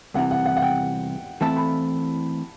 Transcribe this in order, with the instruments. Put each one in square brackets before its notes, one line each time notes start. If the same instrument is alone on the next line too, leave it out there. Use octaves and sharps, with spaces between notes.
[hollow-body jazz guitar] C2 C3 E3 [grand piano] F#5
[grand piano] F#5
F#5
F#5
G5
[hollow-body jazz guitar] E3 A3 C4 E4 A4 [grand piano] A5
[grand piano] B5